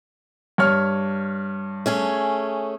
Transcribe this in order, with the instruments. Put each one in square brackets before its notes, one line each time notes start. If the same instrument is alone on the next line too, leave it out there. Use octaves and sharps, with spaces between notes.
[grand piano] G2 C#5 F6
[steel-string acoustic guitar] A3 C#4 G#4